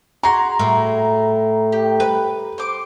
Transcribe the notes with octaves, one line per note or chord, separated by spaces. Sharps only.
F#4 G#4 A#5 C6
A2
G4
B4
C5 D6